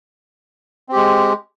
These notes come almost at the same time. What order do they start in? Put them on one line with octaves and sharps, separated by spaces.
C4 G4 G#3